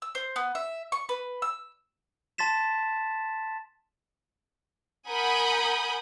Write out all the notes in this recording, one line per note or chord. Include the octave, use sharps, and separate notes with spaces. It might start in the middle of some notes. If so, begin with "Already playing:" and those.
E6
C5
B3
E5
C#6
B4
E6
A5 C6 A6 B6 E7
A#4 F#5 G#5 B5 D#6 G6